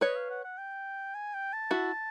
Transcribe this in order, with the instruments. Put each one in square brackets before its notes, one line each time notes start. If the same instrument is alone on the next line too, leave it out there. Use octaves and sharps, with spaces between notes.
[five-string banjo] B4 C#5 [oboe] D#5
[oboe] F5
F#5
F#5
G5
G#5
G5
A5
[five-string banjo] E4 F#4